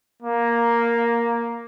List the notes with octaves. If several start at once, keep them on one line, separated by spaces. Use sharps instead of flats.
A#3